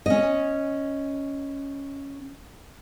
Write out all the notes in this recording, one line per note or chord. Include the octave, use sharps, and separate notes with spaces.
C#4 D#5